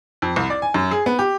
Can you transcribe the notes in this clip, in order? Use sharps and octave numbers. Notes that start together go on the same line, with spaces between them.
F2
C2
D5
G#5
F#2
G#4
B3
G4